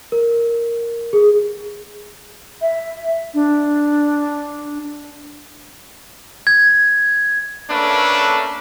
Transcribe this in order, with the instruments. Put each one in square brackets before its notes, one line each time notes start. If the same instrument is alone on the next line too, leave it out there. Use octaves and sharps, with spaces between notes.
[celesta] A#4
G#4
[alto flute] E5
D4
[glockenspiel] G#6
[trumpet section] A3 A#3 C#4 D4 A4 B4